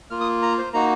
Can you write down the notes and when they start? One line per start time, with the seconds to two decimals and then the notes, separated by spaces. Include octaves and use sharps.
0.10 A#3 F4 F6
0.21 D#6
0.42 A#5
0.58 C5
0.73 A#3 D#4 F#4 A#5